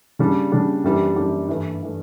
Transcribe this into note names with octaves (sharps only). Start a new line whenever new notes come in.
C#3 G3 D4
C#3 G3 D4
F#2 E3 G3 D4 G4
F#2 E3 G3 D4 G4
G2 E3 A3
E3 A3